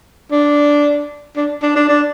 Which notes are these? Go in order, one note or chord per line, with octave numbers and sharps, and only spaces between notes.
D4
D4
D4
D4
D4